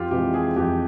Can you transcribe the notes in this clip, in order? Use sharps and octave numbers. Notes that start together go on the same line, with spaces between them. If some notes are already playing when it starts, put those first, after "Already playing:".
Already playing: F2 F4 G4
C3 E3 G#3 G4
G#4
F2 G4